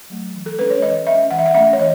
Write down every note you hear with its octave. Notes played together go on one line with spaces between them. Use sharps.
F#3 A3
E3
A4
G#3 C#4 B4
C#5
E3 D#5
G#3 C#4 E5
E3 F#5
E5
F#5
A3 C#4 E5
C#5
E3 D#5